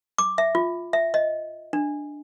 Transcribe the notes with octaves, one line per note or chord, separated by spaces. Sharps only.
D6
E5
F4
E5
D#5
D4